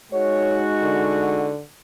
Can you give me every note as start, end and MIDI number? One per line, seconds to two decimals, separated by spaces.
0.13 1.53 56
0.13 1.53 63
0.13 1.53 66
0.13 0.60 73
0.83 1.62 50